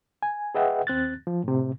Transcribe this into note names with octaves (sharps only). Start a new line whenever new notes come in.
G#5
G#4 B4 D#5 E5 F#5 G5
D#2 C4 F#6 A6
F3
A2 C3